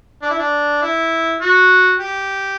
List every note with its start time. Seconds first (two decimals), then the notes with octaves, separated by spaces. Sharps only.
0.22 D4
0.30 E4
0.39 D4
0.82 E4
1.41 F#4
1.99 G4